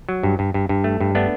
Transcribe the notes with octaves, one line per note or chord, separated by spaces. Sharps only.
F#3
G2
G2
G2
G2
A3
G2
A3 B3 D4